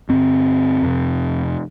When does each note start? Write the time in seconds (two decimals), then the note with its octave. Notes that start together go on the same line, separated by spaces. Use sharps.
0.09 G2 D3 C4
0.82 F2 C3